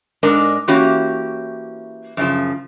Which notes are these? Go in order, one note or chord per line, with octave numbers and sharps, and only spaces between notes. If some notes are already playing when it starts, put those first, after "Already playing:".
G#2 G#3 D4 A#4 D5
E3 A#3 C#4 F#4 G4
F#2 C#3 F3